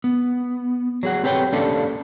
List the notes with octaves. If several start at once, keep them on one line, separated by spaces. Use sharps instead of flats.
B3
F#3 G#4 F#5
C4 G4 A4 B4 C#5 G5
A#3 C#4 D4 G4 A4 F5